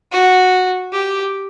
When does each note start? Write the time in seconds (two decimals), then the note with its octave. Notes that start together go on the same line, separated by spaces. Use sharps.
0.12 F#4
0.93 G4